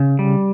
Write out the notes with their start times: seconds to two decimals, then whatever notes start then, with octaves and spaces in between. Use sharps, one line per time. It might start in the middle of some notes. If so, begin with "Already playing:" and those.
Already playing: C#3
0.19 G3